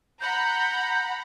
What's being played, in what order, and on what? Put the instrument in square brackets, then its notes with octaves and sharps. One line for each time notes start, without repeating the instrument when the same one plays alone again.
[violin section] F#5 A#5 B5 [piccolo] G6